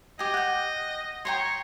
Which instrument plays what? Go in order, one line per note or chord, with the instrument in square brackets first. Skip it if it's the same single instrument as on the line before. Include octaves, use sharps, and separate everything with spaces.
[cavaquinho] G4 G#5 [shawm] D#5
[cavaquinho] F#5 G5
[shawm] C#5 [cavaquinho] G5 A#5 C6